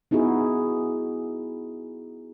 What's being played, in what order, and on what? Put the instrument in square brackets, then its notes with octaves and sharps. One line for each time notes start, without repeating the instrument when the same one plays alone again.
[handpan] B3 D#4 E4 F#4 G#4